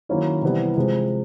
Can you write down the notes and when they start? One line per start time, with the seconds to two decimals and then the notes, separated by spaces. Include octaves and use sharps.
0.09 D#3 F#3 A#3 C#4 E4
0.42 C3 E3 G3 B3 E4
0.77 C3 F3 G#3